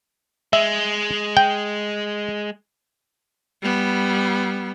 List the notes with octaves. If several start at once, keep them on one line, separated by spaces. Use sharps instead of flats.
G#3 E5
G5
G3 B3